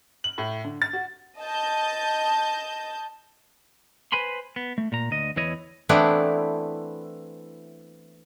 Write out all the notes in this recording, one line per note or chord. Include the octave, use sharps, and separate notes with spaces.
F#7
A2
D3
A6
F#4
D#5 A5 G6
B4 C5 G#5 B5 C6
B3
A3
A#2 A#5
D2 D#5
E2 E3 E4 C#5 D#5
E3 A3 B3 C4 D4 E4